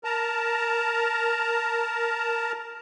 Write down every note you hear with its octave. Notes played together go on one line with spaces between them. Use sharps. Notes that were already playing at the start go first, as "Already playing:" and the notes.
A#4 A5 A#5